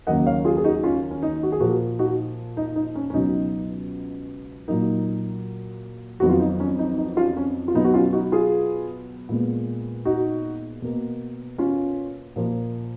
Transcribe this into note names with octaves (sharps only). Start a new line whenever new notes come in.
D#2 C#3 F#3 A#3 D#5 F#5
C#5 F5
F4 G#4
G#4
D#4 F#4
C#4 F4
C#4
D#4
F#4
G#4
A#2 F3 A#3 F#4 A#4
D#4 F#4
D#4
D#4
C#4
C#4
C#2 B2 F#3 D#4
A#2 F#3 A#3 D#4
F2 D#3 F#3 B3 F#4
F4
D#4
C#4
D#4
D#4
C#4 F4
C#4
F4
B2 F#3 B3 D#4
F#4
C#4 F4
D#4 F#4
F4 G#4
A#2 G#3 B3
D#4 F#4
B2 A#3
C#4 F4
A#2 F3 A#3